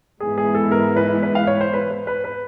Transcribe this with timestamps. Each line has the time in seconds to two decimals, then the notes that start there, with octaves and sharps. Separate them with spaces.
0.20 G#2 E3 G#3 B3 E4 G#4
0.38 G#4
0.55 A4
0.71 A#4
0.96 B4
1.23 B4
1.35 F5
1.47 C#5
1.61 C5
1.74 B4
1.91 B4
2.07 B4
2.24 B4